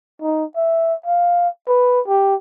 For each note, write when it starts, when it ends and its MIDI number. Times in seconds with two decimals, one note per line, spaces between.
0.22 0.45 63
0.56 0.94 76
1.06 1.48 77
1.68 2.00 71
2.08 2.35 67